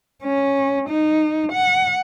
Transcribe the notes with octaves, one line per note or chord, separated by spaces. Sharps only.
C#4
D#4
F#5